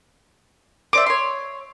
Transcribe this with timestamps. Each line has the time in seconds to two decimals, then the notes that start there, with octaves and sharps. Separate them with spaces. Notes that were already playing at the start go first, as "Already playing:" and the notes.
0.93 C5 D5 E5 D6
1.06 C#5 C6